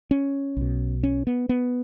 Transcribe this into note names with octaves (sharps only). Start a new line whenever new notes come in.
C#4
B1 B2
C#4
B3
B3